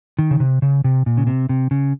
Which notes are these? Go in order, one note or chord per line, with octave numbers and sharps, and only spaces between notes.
D#3
C#3
C3
C#3
C3
A#2
C#3
C3
C3
C#3